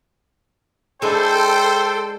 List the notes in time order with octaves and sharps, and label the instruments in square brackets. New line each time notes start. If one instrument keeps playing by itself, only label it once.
[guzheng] G#3 D4 E4 [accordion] A4 [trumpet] C5 [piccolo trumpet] G5